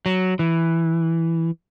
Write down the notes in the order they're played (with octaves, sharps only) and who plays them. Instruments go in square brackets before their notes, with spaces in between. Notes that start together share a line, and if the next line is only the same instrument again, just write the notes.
[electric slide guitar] F#3
E3